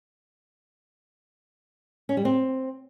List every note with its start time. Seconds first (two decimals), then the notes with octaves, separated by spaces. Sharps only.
2.09 C#4
2.17 G3
2.25 C4